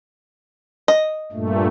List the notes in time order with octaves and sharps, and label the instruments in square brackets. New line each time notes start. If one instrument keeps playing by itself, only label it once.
[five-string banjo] D#5
[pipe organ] G2 A#2 A3